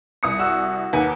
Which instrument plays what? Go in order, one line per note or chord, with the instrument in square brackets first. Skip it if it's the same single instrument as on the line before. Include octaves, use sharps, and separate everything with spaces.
[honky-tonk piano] C2 D#6 C#7
[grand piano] F#4 E6
[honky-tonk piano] D#2 [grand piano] B4 F#5 G#5